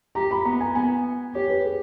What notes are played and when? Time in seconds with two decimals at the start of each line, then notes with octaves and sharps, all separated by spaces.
0.15 G4 A#5
0.31 B5
0.45 B3 A#5
0.60 G#5
0.75 B3 G#5
1.35 G4 C#5
1.50 B4
1.65 G#4